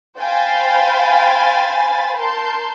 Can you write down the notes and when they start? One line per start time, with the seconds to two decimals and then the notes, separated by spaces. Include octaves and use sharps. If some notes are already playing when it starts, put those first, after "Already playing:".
0.18 C5 F5 G5 G#5 B5 A6
2.17 A#4 A5 C6 G6